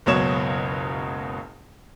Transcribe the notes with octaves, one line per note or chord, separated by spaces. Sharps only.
F#1 C#2 B2 F#3 C#5 E7